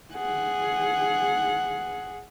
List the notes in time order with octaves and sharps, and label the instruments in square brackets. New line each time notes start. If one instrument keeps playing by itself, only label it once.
[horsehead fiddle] G#4 F#5